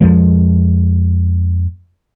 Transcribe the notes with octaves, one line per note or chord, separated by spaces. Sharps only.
F2 F3 G#3